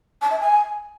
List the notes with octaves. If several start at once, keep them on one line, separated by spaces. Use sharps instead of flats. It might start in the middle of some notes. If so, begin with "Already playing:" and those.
A5
E5
G#5